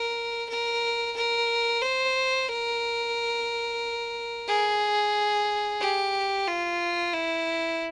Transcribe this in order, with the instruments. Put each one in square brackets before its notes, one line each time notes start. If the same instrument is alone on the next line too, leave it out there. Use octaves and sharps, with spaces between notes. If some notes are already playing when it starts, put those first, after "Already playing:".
Already playing: [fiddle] A#4
A#4
A#4
C5
A#4
G#4
G4
F4
E4